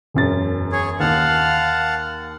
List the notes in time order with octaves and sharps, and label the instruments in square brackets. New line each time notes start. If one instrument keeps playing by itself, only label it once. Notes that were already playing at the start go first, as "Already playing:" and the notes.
[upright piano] E1 F#2 A6
[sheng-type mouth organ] G#4 C#5
[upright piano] D#2 [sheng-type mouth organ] F5 F#5 A5